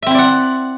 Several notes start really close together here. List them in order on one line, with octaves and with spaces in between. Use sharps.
E5 C4 E4 D5 F#5